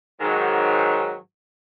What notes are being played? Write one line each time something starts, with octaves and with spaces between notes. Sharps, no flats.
G#2 D#3 F#3